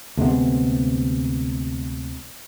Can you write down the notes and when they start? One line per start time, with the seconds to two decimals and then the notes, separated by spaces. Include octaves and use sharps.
0.17 D2 C3 G#3 B3